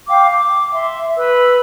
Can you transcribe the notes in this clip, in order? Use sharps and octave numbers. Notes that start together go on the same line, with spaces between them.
F5 G5 D6
D6
E5 C6
B4 E6